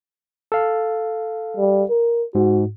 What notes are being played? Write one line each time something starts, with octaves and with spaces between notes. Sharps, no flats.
A4 F5
G3
A#4
G#2 F#4